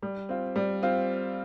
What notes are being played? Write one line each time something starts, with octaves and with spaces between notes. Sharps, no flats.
G3
C4 F4
G3
C4 F4